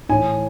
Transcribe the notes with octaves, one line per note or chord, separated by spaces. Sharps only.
A2 E3 G#5